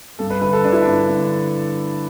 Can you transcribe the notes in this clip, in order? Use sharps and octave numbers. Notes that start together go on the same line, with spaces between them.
G2 A4
B4
D3 B4
A4
D3 D4
E4
G2 D4
D3